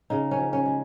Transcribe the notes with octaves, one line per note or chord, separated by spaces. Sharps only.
C#3 D#4
C#4
F3
C#4
G#3